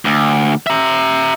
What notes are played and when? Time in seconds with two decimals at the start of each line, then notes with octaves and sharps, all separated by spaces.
0.05 D2
0.67 E5 A#5